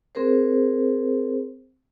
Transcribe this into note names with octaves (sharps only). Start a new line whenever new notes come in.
C4 G#4 A#4 C5